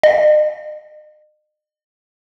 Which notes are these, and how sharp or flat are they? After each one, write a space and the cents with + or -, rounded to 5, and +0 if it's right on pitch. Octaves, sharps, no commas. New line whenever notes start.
D#5 -40